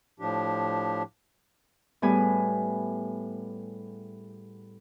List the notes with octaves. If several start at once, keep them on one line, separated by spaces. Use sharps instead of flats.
A2 F3 D4 G4
A2 G3 B3 G#4 B4 G#5